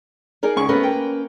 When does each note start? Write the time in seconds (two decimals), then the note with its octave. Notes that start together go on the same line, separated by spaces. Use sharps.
0.43 D#4 G#4 A#4 D5
0.56 C#2 C#6
0.69 A3 B3 C#4 A#4 B4
0.83 A#3 G5